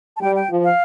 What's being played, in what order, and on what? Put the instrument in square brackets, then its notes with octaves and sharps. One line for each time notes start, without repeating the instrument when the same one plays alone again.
[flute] A5
[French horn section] G3 [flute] G5
[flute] G5
[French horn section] F3
[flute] F5